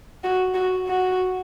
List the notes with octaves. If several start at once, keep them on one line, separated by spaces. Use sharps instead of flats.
F#4
F#4
F#4